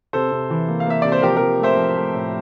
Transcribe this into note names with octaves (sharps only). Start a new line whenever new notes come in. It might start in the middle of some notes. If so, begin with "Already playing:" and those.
C3 A4 C5
C3
E3
A#3
F5
A#3 E5
C3 D5
C5
F3 G4 A#4
F3 G4 A#4
A3 C5 E5
F3
A3
A2